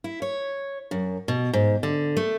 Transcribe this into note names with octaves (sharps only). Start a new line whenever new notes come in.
E4
C#5
F#2
B2
G#2
D3
A3